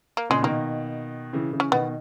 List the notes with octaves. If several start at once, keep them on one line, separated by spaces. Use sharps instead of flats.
A#3
A#2 C#3 G#3
B2 D#3 A#3
C#3 E3
C#3 E3
C#4
B2 D#3 B3